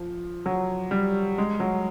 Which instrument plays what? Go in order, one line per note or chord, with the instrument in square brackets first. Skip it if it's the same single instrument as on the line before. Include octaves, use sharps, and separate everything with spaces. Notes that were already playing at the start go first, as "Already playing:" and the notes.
Already playing: [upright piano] F3
F#3
G3
G#3
F#3